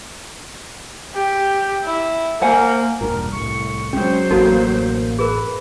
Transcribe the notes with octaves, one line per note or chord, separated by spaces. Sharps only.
G4
E4
A#3 C5 F#5 G#5
E1 G2 A#2 A#4
C2 A2 C#6
F#3 G#3 C#4 C5
A1 F#2 A2 A#3 D#4 F#4 A4
G#4 A#4 B4